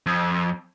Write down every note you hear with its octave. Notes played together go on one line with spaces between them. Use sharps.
F2